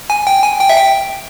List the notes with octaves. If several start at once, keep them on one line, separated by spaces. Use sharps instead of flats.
G#5
G5
G#5
G5
E5
G5